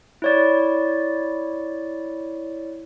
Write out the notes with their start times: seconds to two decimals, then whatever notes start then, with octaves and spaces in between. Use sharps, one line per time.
0.22 E4 C#5 D5